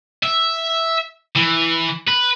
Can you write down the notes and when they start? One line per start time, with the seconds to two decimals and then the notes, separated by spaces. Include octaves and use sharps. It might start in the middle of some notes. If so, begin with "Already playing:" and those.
0.23 E5
1.35 E3
2.08 B4